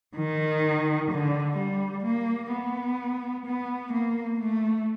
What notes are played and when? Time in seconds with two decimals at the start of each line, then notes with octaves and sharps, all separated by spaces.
0.16 D#3
1.11 D3
1.57 G3
2.05 A#3
2.52 B3
3.45 B3
3.93 A#3
4.39 A3